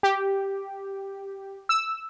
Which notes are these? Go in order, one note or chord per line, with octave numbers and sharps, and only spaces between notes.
G4
E6